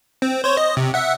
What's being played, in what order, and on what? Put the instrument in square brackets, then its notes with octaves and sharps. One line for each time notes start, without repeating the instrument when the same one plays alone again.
[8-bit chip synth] C4
C5 C#5
D#5
C3
E5 F#5